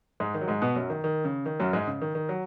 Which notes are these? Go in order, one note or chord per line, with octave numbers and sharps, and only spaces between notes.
G#2 G#3
D#3
F#3
G#2 G#3
B2 B3
F#2 F#3
D#3
D#3
C#3
D#3
F#2 F#3
G#2 G#3
C#3
D#3
D#3
F#3